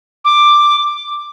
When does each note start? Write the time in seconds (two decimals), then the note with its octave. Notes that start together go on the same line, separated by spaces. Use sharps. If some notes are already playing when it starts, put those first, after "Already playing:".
0.25 D6